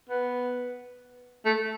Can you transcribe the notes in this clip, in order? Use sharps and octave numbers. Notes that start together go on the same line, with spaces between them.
B3
A3